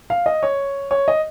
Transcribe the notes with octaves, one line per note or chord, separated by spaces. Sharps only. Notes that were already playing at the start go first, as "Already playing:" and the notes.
F5
D#5
C#5
C#5
D#5